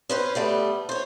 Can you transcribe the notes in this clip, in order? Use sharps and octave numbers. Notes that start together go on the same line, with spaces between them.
C#4 B4 C5
G3 A3 B3
C5 C#5